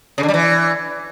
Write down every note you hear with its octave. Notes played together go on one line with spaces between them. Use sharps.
C#3
D3
G3
E3